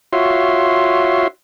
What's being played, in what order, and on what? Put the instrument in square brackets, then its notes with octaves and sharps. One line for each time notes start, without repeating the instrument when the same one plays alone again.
[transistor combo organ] F4 F#4 C#5 E5 C6